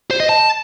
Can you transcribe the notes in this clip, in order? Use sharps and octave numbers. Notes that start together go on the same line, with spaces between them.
C5
D#5
A5